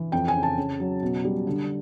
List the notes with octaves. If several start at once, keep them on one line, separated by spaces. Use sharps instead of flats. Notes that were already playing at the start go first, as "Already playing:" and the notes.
Already playing: E3
F2 G5
G#5
C#3
A5
C#3
F#3
B2
G3
D3